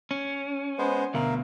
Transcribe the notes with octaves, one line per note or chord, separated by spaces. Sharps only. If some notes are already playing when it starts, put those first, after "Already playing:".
C#4
G#3 B3 C5
D2 B2 A#4 E5 F5